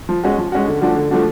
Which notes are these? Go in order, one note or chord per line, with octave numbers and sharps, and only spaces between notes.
F3
G#3 C#4 F#4
F3
G#3 C#4 F#4
D3
F3 A3 D4 F#4
D3
F3 A3 D4 F#4